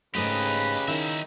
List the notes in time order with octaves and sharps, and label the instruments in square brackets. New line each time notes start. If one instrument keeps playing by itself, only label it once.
[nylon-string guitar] G#2 A3 [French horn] C#3 [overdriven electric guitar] G4 D#5 [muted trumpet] B4
[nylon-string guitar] D#3 E4 [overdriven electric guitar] D#4 E5